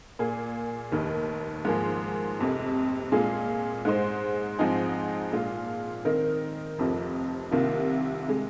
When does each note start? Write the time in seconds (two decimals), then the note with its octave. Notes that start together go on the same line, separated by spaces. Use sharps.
0.19 A#2 A#3 G#4
0.92 F1 D#2 D#3
1.65 G#2 F3 A#3 G#4
2.39 F1 F2 C3
3.12 A#2 G#3 F4 G#4
3.85 G#2 G#3 D#4 C5
4.59 G#2 F3 C4 D#4 G#4
5.32 A#2 G#3 F4
6.05 D#3 C4 D#4 A#4
6.78 F1 F2 C3 F3
7.51 C2 C3 D#3 A#3 F4
8.28 C3 G#3